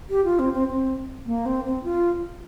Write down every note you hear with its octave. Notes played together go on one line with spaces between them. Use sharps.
G4
F4
C4
C4
C4
A#3
C4
C4
F4